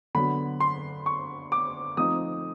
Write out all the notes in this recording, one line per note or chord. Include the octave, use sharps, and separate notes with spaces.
D3 F#3 B3 B5
C6
C#6
D6
F3 A3 C4 D#4 D#6